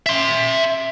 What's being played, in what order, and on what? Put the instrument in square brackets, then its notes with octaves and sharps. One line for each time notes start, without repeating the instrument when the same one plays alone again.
[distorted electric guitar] E5 C6